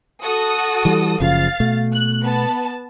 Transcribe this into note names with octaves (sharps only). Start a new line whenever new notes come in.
F#4 A4 D#6
E3 G3
F#1 C#3 F3 F5 A6
B2 A3
F#6
B3 A5